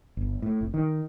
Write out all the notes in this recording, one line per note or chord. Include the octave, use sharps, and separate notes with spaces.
G1
A2
F1
D#3